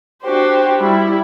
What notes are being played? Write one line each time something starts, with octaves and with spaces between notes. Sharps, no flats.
D4 F#4 G4 C5
G3 E4